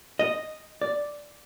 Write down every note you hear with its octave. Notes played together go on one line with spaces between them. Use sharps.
D#5
D5